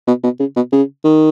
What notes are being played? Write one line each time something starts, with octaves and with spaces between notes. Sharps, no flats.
B2
B2
C#3
B2
C#3
D#3